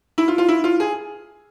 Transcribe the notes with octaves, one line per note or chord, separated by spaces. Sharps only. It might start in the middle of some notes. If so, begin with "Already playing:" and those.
E4
F4
F4
E4
F4
G#4